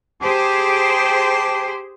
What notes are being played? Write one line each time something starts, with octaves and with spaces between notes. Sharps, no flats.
G4 G#4 C5 G5 A5 D6